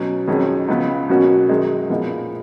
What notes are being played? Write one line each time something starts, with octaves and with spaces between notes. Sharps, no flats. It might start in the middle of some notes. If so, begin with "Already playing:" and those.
Already playing: B2 F#3 C#4
F2 D#3 F#3 C#4 G#4
C#2 C#3 F3 B3
B2 F#3 A#3 C#4 F#4
F#2 D#3 G#3 D#4
A#2 F3 B3 D#4 G#4